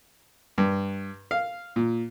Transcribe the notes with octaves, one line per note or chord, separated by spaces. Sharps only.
G2
F5
A#2